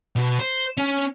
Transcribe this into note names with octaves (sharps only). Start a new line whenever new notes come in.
B2
C5
C#4